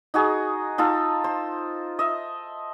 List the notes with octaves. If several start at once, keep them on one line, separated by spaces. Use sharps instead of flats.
D#4 F#4 G#4
D#4 F4 A4
C5
D#5 E5